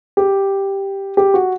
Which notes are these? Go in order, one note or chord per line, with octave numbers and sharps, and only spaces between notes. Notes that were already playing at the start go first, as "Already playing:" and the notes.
G4
G4
F#4